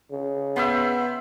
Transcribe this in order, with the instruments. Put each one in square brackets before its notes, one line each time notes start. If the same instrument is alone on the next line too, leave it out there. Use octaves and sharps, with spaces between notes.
[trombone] C#3
[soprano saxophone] B3 [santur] E5 G5 C6